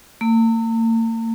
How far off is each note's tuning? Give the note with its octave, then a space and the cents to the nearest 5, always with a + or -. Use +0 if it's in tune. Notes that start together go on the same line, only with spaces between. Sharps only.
A#3 -45